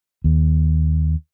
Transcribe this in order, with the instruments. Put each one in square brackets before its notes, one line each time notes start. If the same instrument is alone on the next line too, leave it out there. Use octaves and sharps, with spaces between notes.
[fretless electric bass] D#2